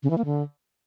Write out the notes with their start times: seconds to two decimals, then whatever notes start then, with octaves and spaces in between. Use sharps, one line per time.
0.03 C#3
0.10 E3
0.18 A#3
0.25 D3